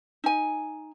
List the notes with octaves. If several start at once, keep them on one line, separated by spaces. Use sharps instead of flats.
D#4 G#5